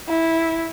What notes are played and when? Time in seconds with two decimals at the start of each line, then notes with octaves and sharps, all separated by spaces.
0.09 E4